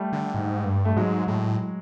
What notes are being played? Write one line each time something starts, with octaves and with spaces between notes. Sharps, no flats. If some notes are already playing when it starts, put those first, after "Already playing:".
Already playing: G3 A3
D3
G#2
G2
A3
G#2 F#3 G#3
A2